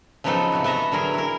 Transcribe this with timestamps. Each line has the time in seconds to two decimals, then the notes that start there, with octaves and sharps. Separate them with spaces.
0.24 C#3 F3 F#3 B3 D#4 A4
0.52 C3 F#4
0.64 B3 A4 E5 A#5
0.92 D3 F#3 G#4 A#4
1.14 E4 A#4